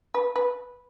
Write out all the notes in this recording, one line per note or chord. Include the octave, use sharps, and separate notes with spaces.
B4
B4